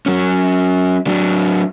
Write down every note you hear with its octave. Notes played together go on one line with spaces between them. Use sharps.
F#3 C#4
F#3 D4